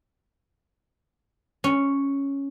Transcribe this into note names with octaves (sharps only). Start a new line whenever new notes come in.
C#4